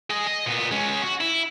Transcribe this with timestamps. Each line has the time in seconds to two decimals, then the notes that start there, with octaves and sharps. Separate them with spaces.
0.10 G#4 D#5
0.27 D#5
0.46 A#2 B3
0.71 G#3 C#4
1.02 F#4
1.21 E4